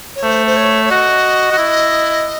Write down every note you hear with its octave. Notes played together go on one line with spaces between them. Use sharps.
C#5
A3 C5
C5
C#5
C#5
F#4 D#5
F#4
E4